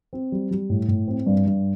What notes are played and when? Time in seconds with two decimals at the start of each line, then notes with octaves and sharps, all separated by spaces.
0.13 C4
0.32 G3
0.51 G3
0.70 A2
0.88 A2
1.08 C4
1.26 G2
1.46 G2